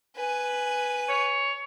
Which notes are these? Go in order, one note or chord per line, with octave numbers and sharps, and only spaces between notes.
B4 G#5
C#5